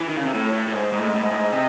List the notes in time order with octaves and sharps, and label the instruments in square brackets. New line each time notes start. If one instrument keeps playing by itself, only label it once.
[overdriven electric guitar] E3
D#3
C#3
C3
[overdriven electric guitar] A2 [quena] A4
[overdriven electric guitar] A2 [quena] C#5
[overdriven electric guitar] A2 [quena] C#5
[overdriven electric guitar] G#2 [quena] C5
[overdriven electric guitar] G#2 [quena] D#5
[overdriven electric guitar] A2
G#2
A2
[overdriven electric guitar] G#2 [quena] D#5
[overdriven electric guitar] A2
G#2
[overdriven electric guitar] C3 [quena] D#5